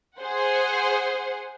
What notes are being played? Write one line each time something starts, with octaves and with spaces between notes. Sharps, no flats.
G#4 C5 F#5